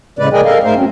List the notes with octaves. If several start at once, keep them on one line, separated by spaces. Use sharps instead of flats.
A2 C#3 G#3 B4 D5
G#4 A#4 D5 D#5 G5 G#5
A4 A#4 D#5 F5
G#2 A3 A#4 C5 F5
F#3 C4 C#4